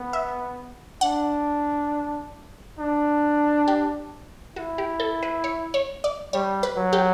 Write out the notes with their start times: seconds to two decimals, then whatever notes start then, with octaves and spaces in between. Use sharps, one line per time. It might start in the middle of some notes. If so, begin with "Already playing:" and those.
Already playing: B3
0.13 E5
1.01 D4 F#5
2.79 D4
3.68 G4
4.56 E4 F#4
4.78 G4
5.00 A4
5.23 B4
5.44 C#5
5.74 C#5
6.04 D5
6.33 G3 C#5
6.63 B4
6.77 F#3
6.93 G4